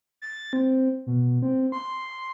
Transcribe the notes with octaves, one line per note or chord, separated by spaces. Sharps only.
A6
C4
B2
C4
C6